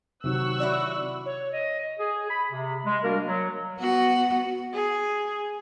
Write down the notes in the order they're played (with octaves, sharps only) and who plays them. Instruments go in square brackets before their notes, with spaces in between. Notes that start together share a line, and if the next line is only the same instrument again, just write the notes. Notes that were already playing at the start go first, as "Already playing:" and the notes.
[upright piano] C3 D#3 [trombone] F#3 [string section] C#6 E6 F#6
[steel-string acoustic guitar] E4 F#4 D5
[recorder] C#5
D#5
[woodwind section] G#4
B5
C3
G#3
G3 A#3 D4 F#4 A#4
F#3
[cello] B3 F#4
[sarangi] G#4